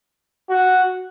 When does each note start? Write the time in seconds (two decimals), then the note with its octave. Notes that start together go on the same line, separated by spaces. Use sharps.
0.50 F#4